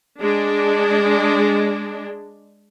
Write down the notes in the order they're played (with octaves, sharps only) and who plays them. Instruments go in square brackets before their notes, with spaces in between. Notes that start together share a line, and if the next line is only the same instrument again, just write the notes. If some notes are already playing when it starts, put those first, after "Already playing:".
[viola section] G#3 D4